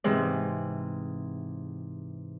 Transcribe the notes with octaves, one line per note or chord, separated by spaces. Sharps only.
G#2 C3 E3 G#3